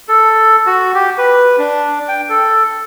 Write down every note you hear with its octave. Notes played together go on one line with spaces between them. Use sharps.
A4
F#4
G4
B4
D4
G5
A4